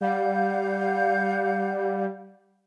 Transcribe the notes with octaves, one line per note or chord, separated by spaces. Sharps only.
G3 F5 F#5 G6